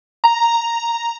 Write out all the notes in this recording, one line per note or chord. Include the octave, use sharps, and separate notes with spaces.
A#5